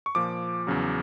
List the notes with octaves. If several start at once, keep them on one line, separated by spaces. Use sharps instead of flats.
C#6
A#2 F3 D6
E2 C#3 F#3